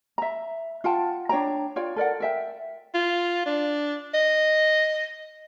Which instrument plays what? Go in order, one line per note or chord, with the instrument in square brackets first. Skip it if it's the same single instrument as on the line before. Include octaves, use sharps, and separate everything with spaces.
[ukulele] E5 A#5
F4 F#5 G5 A5
D4 C#5 G5 A#5
F4 C#5 D5 G5
A4 A#4 D5 F#5
A#4 E5 G5
[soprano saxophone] F4
D4
D#5